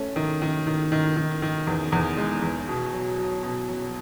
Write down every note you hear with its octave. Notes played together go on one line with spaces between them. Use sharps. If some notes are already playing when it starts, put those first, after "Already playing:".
Already playing: A3 C#4
D#3
D#3
D#3
D#3
D#3
D#3
E2
E2
G#3
E2
B2
F#3
F#3
B2
F#3